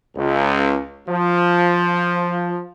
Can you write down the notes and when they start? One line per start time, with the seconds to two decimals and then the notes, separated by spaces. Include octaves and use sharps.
0.16 C#2
1.08 F3